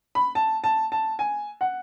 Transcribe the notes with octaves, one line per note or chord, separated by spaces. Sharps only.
B5
A5
A5
A5
G#5
F#5